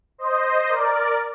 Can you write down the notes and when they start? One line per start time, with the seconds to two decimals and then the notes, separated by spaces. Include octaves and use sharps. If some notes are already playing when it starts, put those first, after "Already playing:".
0.18 C5 D#5
0.68 A#4 D5